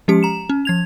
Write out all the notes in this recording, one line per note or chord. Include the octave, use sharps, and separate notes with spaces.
F3 G#3 C#4 G4 C#7
A#5 E7
C#4
F3 G#6 F7